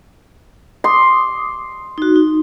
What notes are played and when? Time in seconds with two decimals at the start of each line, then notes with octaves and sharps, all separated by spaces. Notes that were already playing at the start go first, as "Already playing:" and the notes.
0.84 C6 D6 D#6
1.98 D#4 F#4
2.16 D#4